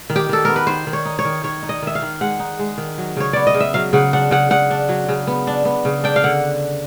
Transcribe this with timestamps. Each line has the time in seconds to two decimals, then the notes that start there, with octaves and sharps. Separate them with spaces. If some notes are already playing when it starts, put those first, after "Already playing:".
0.10 D#3
0.16 G4
0.29 D#3 A4
0.45 B3 A#4
0.56 B4
0.67 D#3 C5
0.87 D#3
0.93 C#5
1.05 D#4
1.19 C#5
1.25 D#3
1.44 D#3 C#5
1.63 D#4
1.69 D#5
1.82 D#3 E5
1.95 F5
2.02 D#3
2.21 G#3 F#5
2.40 D#4
2.59 G#3
2.78 D#3
2.98 F#3
3.17 C#3 C#5
3.33 B3 D5
3.47 D#5
3.54 C#3
3.60 E5
3.74 F#3 F5
3.93 C#3 F#5
4.13 D4 F#5
4.31 C#3 F#5
4.50 C#3 F#5
4.70 D4
4.89 F#3
5.08 C#3
5.27 B3
5.47 D4
5.65 B3
5.85 C#3
6.04 D4 G5
6.16 F5
6.24 D3 F#5